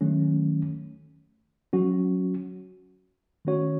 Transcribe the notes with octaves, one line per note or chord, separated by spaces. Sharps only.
D#3 F#3 A3 C#4
F#3 C#4 F#4
D#3 A3 C#4 F#4 C#5